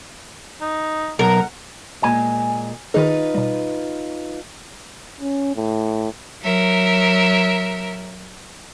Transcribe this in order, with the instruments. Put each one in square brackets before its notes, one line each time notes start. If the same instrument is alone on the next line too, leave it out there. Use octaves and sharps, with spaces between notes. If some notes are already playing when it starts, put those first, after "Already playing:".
[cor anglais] D#4
[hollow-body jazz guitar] B1 [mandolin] A#4 [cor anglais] F#5
[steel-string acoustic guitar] A#2 G#3 [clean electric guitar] G#5
[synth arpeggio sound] D#3 G#4 [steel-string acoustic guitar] D#4 F4 B4
[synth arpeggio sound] B2 G3
[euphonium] C#4
A2
[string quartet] F#3 A#4 E5